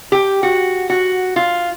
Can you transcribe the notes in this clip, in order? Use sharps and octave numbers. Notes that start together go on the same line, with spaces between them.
G4
F#4
F#4
F4